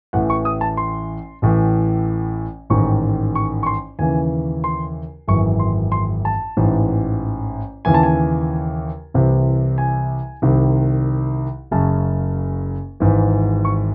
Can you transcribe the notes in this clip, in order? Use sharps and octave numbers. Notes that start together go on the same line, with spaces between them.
A1 A2 E3 F#5
C#6
D#6
A5
C6
A1 A2 E3
A1 G#2 D#3 C#6
C#6
C#6
C6
D#2 C#3 E3 G#5
C6
G#1 F#2 E3 C#6
C6
C6
A5
A1 G#2 E3
D#2 C#3 E3 G#5
A5
G#5
C2 C3 E3
G#5
C2 C3 D#3
F#1 F#2 C#3 A5
G#1 G#2 E3
C#6